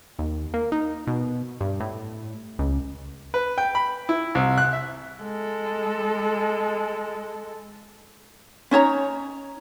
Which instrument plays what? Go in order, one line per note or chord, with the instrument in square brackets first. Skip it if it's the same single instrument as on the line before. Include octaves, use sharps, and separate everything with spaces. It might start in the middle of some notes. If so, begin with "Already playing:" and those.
[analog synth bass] D#2
A#3
D#4
B2
G2
A2
C#2
[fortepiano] B4
G5
B5
E4
C2
F#6
E5
[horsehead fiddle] G#3 A4
[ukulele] C#4 D#4 C#5 A#5